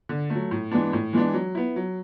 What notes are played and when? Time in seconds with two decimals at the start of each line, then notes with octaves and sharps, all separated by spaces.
0.09 D3
0.30 A3
0.35 F#3
0.51 A2
0.71 E3 G#3 B3 D4
0.93 A2
1.13 E3 G#3 B3 D4
1.34 F#3
1.55 B3 E4
1.76 F#3